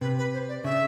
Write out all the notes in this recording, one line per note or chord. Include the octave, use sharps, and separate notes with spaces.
C3 B4
B4
C5
D5
C#3 E5